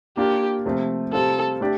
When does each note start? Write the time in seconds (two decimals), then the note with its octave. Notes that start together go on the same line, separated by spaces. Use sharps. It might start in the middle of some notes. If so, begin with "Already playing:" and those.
0.17 A#3 D4 F4 G4
0.66 C3 F3 A3 C4
1.13 C3 G3 C4 F4 A4
1.60 A3 D4 G4 D5